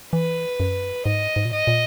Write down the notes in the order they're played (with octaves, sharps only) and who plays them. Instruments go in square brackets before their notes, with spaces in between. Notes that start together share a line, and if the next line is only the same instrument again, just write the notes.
[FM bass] E3 [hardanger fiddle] B4
[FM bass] F#2
[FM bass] G#2 [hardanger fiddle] D#5
[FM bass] G#2
A#2
[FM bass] G#2 [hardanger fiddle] D#5
[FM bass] A#2